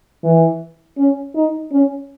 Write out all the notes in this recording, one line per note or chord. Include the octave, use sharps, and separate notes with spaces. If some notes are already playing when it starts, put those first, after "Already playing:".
E3
C#4
D#4
C#4